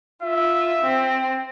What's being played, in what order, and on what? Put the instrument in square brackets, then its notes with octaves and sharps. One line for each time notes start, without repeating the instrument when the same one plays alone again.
[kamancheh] F4 [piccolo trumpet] E5
[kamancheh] C4